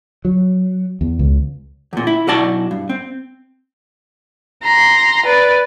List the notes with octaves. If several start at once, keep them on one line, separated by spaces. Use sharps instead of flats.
F#3
E2
C#2
E2 A#2
E4
B1 E4 F#4 D5 A5
G2
C4
A#5 C6
B4 D5